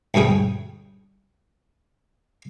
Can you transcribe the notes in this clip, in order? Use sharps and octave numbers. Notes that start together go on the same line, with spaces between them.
D2 G2 C#4 G#4 G5